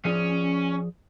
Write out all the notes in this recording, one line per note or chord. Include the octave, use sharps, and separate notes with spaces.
F3 C#4 G#4 D5